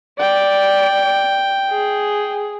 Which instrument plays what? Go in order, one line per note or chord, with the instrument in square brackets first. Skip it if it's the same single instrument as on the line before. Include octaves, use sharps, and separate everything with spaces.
[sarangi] D5 [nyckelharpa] G5
[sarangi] G#4